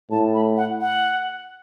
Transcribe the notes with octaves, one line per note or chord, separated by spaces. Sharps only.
A2 A5
B5
F#5
F#5